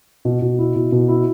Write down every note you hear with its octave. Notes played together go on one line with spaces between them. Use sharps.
B2
B2
E4
B2
B2
E4